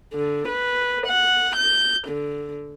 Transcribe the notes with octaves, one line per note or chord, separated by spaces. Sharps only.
D3
B4
F#5
G6
D3